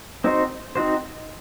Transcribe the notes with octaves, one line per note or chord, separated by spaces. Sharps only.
C4 D#4 F#4 C5
C4 D#4 F#4 C5